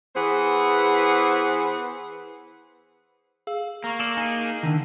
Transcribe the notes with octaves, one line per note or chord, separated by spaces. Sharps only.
E3 B3 G#4 C5
G#4 F5 E6
A#3 A#5 C#6
A4 D5 C#6
D#4 G#4 G#5
D3 D#3